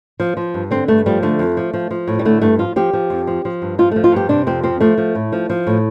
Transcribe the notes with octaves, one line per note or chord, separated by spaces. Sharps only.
F3
F3
G2
D3 C4
G2 A3
F3 G3
D3 A3
F2
F3
F3
F3
A2
G3
D3 A3
G2 A3
F3 F4
F3 G4
F3
F2
F3
F3
G2
F3 F4
A3
F3
F4
G2 G4
C3 D4
F2 C4
F3 C4
F3 A3
F3
A2
F3
F3
A2